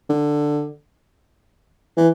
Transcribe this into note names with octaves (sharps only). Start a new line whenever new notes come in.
D3
E3